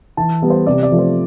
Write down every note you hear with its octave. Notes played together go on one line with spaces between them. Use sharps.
E3 A5
G3 B3
C5
C3 D5
D5
F3 A3
C5